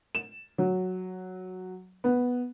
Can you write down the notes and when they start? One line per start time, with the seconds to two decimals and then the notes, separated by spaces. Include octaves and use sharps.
0.15 E7
0.58 F#3
2.04 B3